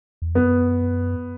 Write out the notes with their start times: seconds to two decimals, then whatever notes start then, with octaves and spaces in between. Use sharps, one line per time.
0.22 E2
0.35 F#2 B3